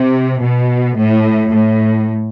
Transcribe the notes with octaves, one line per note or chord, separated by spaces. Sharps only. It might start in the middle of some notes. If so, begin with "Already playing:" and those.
Already playing: C3
B2
A2
A2